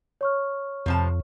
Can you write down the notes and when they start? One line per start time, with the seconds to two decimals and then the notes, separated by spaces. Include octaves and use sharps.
0.21 C#5 C#6 F6
0.86 F2 C3 F3 A5